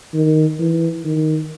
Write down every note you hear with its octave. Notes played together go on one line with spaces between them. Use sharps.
D#3
E3
D#3